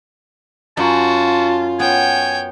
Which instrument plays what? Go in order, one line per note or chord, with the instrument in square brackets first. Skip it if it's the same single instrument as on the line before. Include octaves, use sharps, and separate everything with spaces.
[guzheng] F#2 [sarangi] F4 [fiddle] F#4 [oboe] A5
[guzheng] B3 [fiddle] C#5 G5 [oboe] G#5